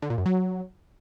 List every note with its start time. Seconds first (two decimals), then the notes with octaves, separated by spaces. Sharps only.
0.02 D3
0.10 A#2
0.18 F#2
0.26 F#3